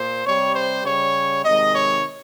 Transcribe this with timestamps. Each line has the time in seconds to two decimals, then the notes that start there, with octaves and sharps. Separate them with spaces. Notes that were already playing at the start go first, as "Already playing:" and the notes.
Already playing: A#2 C5
0.26 C3 G3 C#5
0.55 C5
0.84 C#3 G3 C#5
1.44 C3 D#3 G#3 D#5
1.73 C#5